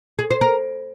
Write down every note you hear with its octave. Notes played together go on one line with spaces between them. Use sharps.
G#4
C5
A#4